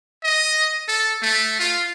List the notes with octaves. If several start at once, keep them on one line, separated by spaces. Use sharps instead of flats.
D#5
A4
A3
F4